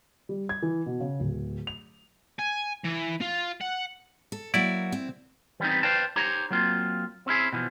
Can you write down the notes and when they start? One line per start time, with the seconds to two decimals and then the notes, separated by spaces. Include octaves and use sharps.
0.29 G3
0.49 G#6
0.62 E3
0.86 B2
1.00 C#3
1.20 D1
1.67 F7
2.39 G#5
2.85 E3
3.21 F4
3.61 F#5
4.32 A4
4.54 F#3 A#3 E4 F#4 D5
4.92 C4
5.60 E3 G3 B3 C4 D#4
5.83 B4 C5 D5 F5 G5 A5
6.16 D#4 G4 C5 C#5 A#5
6.51 F#3 A#3 C4 F4
7.27 C4 C#4 E4 G#4
7.53 B2 E3 F3